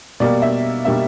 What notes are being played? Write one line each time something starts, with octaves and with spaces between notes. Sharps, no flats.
B2 G3 A#3 D5
E5
B2 G3 A#3 E5